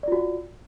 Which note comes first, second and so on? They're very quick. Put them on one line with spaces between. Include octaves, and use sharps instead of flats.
D5 F4 F#4